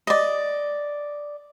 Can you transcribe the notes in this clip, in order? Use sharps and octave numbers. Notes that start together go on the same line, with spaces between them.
D5 D#5